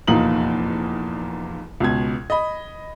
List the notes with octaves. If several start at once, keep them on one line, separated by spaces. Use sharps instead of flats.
F1 E2 A#2 A#3 D#4 F#7
C#2 B2 G#6
D#5 B5